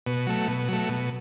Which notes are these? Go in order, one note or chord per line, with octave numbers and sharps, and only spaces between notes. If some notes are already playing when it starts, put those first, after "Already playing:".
B2
F#3 A3
B2
F#3 A3
B2